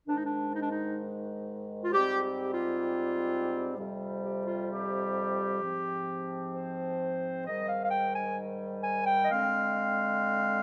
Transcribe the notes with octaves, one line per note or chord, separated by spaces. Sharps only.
G#2 D#3 G#3 D4
D#4
D4
D#4
D4
D#4
F4
G#2 G3 C4 G4
G4
F4
F2 C3 G3
G4
F4
G4
G#2 F3 C4
C5
G#2 D#3 G3 D#5
F5
F5
G5
G#5
G#5
G5
D#5
D3 G#3 C4 F5